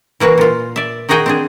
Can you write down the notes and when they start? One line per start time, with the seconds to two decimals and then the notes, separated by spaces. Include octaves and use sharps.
0.20 E3 A#3 F#4 B4
0.38 A#2 F4
0.76 D5 E5
1.09 D#3 D#4 F#4 G#4 G5
1.26 C4 D4 G#4